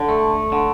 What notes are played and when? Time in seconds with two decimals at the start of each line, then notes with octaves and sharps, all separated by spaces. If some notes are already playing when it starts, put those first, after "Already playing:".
Already playing: D3
0.09 A3
0.52 D3